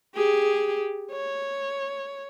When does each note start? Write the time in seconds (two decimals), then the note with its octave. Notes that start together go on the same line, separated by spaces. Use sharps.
0.15 G4 G#4
1.12 C#5